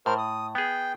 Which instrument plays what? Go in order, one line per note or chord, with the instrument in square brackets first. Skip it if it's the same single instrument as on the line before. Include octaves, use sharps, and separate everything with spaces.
[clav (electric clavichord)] A2 [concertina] A#4 C5 F6
[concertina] D#6
[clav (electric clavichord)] B3 G#4 [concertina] G5